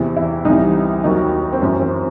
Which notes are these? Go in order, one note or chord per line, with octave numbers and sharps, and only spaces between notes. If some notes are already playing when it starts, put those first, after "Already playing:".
Already playing: E2 C3 E3
E4
C2 C3 E3 D#4
D#2 D#3 F#3 D#4
C4
F#2 E3 C#4
C4